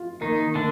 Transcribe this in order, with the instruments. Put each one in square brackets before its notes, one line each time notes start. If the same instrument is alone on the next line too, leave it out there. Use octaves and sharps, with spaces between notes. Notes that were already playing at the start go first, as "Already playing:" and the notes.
Already playing: [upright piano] F4
[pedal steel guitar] D#3 D#4 [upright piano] A#3
[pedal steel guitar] D3 D4 [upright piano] A#3